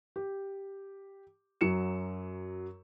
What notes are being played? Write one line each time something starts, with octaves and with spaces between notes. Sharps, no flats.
G4
F#2 F#3 C#7 E7